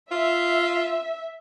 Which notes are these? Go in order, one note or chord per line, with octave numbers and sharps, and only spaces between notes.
F4 E5